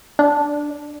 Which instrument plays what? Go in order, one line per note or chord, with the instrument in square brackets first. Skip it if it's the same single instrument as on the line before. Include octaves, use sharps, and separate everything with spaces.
[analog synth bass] D4